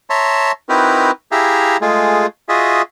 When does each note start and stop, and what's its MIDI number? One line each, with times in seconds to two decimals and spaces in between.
0.10 0.52 73
0.10 0.52 76
0.10 0.52 81
0.10 0.52 82
0.10 0.52 84
0.69 1.11 60
0.69 1.11 63
0.69 1.11 64
0.69 1.11 66
0.69 1.11 70
0.69 1.11 71
1.32 1.77 64
1.32 1.77 67
1.32 1.77 68
1.32 1.77 76
1.32 1.77 77
1.32 1.77 82
1.82 2.26 56
1.82 2.26 57
1.82 2.26 65
1.82 2.26 68
2.49 2.82 65
2.49 2.82 66
2.49 2.82 68
2.49 2.82 75
2.49 2.82 76